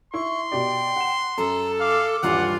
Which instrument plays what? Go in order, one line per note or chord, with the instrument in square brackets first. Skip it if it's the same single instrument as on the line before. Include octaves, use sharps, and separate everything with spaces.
[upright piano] E4 [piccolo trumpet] C6 [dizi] C#6
[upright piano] B2 G4 D5 [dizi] G5
[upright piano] F#5 E7
[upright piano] F#2 [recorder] A4 [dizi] A#5
[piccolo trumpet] F5 [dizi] D6
[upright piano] D#1 G2 E3 [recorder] F4 [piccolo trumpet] F#5